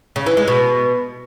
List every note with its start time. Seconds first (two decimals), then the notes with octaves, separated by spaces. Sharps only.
0.16 C#3
0.26 E3
0.37 G#3
0.48 B2